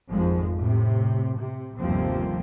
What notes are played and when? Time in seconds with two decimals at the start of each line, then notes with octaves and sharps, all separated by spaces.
0.11 G#1 F2 F3 G#3
0.57 A2 C3
1.38 C3
1.79 G1 D#2 C3 F3 A#3 C4